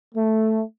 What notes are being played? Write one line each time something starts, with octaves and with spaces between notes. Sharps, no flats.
A3